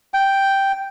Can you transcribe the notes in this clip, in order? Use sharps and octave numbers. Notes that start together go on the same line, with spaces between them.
G5